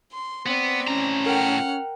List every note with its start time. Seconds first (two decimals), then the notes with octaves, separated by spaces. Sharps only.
0.12 C6
0.46 B3 C4 D5
0.88 A2 C#4 A#5
1.26 A#4 F#5 G5 F6